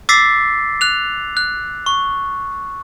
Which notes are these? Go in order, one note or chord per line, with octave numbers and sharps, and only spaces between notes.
D6 E6 A6 B6 C7
F#6 F7
F#6
C#6